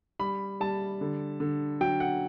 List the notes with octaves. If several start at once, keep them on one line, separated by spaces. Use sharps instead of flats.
G3 B5
G3 A5
D3
D3
F#3 G5
F#5